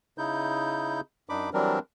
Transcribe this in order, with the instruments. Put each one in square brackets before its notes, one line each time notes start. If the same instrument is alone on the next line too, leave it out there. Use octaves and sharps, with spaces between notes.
[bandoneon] C#3 D#4 E4 G6
F#2 D4 D#4 B5 D6
E3 F#3 G3 C4 D4 A#4